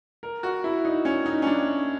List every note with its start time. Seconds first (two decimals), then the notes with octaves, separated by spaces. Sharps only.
0.23 A#4
0.43 F#4
0.64 E4
0.85 D#4
1.05 C#4
1.26 D#4
1.42 C#4
1.47 D4